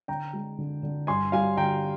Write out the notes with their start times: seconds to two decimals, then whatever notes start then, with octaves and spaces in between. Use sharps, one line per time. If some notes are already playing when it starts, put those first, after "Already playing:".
0.08 D3 G5 A#5
0.33 G#3
0.58 D3
0.83 D3
1.07 G2 G#5 C6
1.32 G3 F5 G#5
1.57 D3 G5 A#5